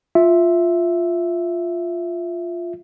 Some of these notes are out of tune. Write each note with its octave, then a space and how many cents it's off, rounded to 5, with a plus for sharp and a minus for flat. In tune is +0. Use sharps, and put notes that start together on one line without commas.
F4 +0 E5 +0